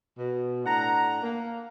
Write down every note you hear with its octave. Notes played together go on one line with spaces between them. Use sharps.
B2
A2 D4 F#5 A#5
A#3